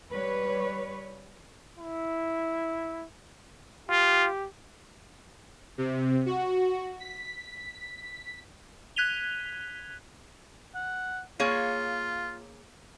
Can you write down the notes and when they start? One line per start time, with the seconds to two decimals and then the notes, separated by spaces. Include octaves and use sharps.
0.11 G3 B4 C#5
1.78 E4
3.89 F4 G4
5.78 C3
6.26 F#4
6.99 B6
8.96 F#6 G#6 B6 D#7 F7 G7
10.75 F#5
11.39 A#3 F4 G#4 C#5